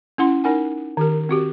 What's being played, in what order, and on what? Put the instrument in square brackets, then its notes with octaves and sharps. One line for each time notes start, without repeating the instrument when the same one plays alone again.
[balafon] C#4 E4 F#5 C6
D#4 A#4 F#5 G#5
D#3 G4 A#4
C4 F#4 G4